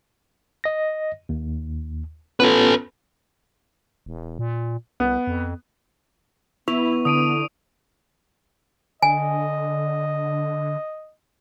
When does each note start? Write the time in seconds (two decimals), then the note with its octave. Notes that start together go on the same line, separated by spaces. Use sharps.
0.64 D#5 A#6
1.29 D#2
2.40 B3 C#4 F4 A4 B4
4.06 E1
4.39 A#2
5.00 C2 B3
5.27 F2
6.68 E3 B3 E4 C#6 F7
7.05 D3 D#6 D7 D#7
9.02 D3 D#5 G#5